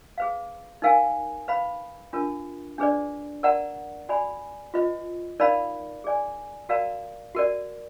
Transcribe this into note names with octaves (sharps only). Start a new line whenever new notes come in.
G#4 B4 F5
D#4 A#4 F5 G#5
B4 F5 B5
D4 F4 A#4
D4 G#4 B4 D5
A#4 D5 F#5 A#5
F#4 D5 G#5 B5
F4 B4 D#5
D#4 A#4 D5 F5 B5
G#4 D5 G#5
F#4 A#4 D5 F5 A#5
F#4 A#4 D5